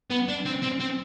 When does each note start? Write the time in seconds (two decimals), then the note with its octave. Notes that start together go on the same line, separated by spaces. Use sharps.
0.10 B3
0.28 D4
0.45 C4
0.62 C4
0.80 C4